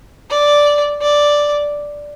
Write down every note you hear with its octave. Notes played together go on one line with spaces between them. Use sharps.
D5
D5